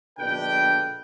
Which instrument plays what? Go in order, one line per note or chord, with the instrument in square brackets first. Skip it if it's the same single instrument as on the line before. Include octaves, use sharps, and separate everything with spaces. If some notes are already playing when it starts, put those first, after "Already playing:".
[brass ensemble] A#1 B2 D3 D4 B4 G5